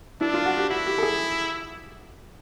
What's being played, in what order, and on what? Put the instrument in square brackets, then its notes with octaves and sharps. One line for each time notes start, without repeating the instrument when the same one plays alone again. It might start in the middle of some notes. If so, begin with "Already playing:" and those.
[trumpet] D4 [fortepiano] E4
[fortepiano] F4
F#4
G4
[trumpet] E4 [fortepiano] F#4
[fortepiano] G4
A4
G#4